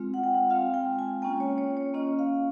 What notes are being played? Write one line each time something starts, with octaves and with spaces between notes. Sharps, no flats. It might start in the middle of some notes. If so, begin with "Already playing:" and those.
Already playing: G#3 C4 F4
F#5
G5
F#5
G#3 C4 F4 F5
G5
G#5
A#3 C#4 F4 G5
C#5
C#5
C#5
A#3 C#4 F4 D#5
F5